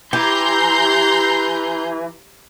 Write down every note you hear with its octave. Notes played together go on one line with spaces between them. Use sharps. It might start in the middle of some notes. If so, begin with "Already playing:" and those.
E3 G4 A#5 C6 G6